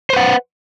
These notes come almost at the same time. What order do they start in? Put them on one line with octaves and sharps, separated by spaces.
C5 B4 F#5